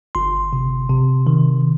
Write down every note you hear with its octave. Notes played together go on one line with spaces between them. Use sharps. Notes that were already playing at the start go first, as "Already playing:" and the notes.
G1 C6
C3
C3
D#3